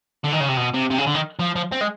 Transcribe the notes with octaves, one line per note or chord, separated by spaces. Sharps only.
D3
D#3
C#3
C3
B2
C3
C3
C#3
D3
D#3
F3
F3
C4
G#3